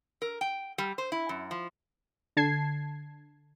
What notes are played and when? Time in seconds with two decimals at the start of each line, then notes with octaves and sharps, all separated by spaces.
0.22 A#4
0.41 G5
0.78 G3
0.98 C5
1.12 E4
1.29 F#2
1.51 F3
2.37 D3 A5 G#6 C7